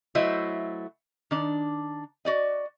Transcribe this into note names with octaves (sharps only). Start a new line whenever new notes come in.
F#3 A3 E4 C5 D#5 E5
D#3 D4
F#4 D5 D#5